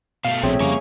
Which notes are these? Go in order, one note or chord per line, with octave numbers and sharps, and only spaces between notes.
B2 A3 F5
A#1 C4 G#4 C#5 E5
F2 C#3 G3 A#3 F5 G#5 C#6